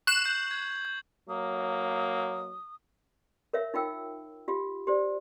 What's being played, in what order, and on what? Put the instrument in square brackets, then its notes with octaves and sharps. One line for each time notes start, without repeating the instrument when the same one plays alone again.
[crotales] C#6 C7 F#7 [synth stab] F#6 E7
[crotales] G6 C7
G#6
G6
[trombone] F#3 [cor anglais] A#3 [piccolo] D#6
[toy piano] A#4 C#5 E5 F5
D#4 F4 F5 G5 E6
F4 G4 F5
G4 C5 D5